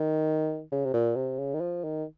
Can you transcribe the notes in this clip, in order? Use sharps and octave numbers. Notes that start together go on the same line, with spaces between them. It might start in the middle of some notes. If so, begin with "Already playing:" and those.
Already playing: D#3
C#3
C3
A#2
C3
C#3
D#3
F3
D#3